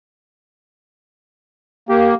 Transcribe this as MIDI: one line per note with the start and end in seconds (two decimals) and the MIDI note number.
1.89 2.15 58
1.89 2.15 67